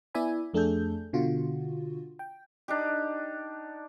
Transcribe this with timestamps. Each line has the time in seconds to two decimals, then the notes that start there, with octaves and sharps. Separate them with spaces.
0.14 B3 E4 D5 E5 G#5 B5
0.54 F2 A3 D4 G#4 A4 G6
1.13 B2 D3 F4 F#4
2.19 G5
2.68 D4 D#4 G4